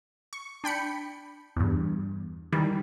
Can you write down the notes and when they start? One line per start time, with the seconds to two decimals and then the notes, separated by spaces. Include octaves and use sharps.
0.33 C#6
0.64 D4 G5 B5 C#7
1.56 E2 G2
2.53 D#3 E3 G3